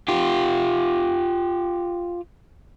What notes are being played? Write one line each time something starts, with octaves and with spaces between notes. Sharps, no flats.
F4 G4